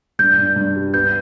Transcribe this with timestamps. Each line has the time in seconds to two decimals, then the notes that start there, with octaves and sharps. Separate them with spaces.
0.19 G2 G6
0.38 G2
0.56 G2
0.76 G3
0.94 B3 G6